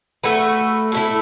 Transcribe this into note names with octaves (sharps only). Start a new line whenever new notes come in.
A3 F#4 B4
A2 A3 E4